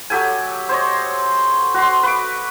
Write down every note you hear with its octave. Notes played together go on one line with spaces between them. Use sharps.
F#3 G4 A4 G#5
C5 C#5 D#5
F#4 C6
B4 C#6 D6